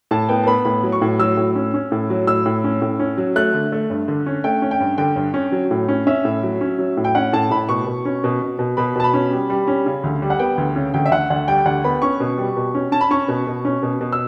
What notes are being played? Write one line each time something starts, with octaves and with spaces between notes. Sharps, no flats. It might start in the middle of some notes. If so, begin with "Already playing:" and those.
A2 A5
B3 G5
A5
B3 B5
A2 B5
F#3
C#6
A2
F#3 E6
A2
C#4
C#4
A2
F#3
A2 E6
A2
C#4
A2
C#4
F#3
A3 F#6
D3
A3
G2
D3
C#4
A3 G5
C#4
G5
G2
D3 G5
G2
C#4
F#3
A2
C#4
C#4 E5
A2
F#3
C#4
F#3
A2
G5
C#4 F#5
A2 A5
A2 B5
B2 C#6
B2
C#4
B2
B2
B2
B2 B5
B2 A5
B5
C#4
G3
G3
C#4
C#3
D2
G3
F#5
B3 G5
D2
C#3
D2 G5
E5
D2 F#5
D2 F#5
G3 G5
D2 F#5
B3 B5
C#4 C#6
B2
G3
B2
C#4
C#4 A5
B5
C#4 C#6
B2
B2
C#4
B2
B2
E6